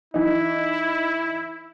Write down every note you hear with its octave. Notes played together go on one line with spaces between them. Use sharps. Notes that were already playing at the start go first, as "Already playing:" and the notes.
E3 D#4 E4